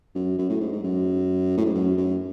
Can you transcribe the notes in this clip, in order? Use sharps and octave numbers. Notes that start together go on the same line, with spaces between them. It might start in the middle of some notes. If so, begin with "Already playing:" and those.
F#2
F#2
A2
G#2
G#2
F#2
A2
G#2
F#2
F#2